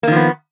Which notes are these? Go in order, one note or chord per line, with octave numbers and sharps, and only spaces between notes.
D#3 F3 A#3 B3